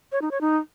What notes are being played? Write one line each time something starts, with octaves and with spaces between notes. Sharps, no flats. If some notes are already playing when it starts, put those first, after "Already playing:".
C#5
D#4
C#5
D#4